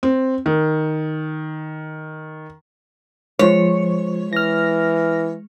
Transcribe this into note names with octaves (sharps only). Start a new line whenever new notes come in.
C4
D#3
F3 G#3 C5 C#5
E3 F6 A#6